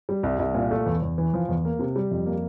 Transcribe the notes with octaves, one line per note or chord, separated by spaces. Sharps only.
G3
C2
C2
A#2
A3
E2
E2
E3
F3
E2
A#3
C3
G3
F2
A#3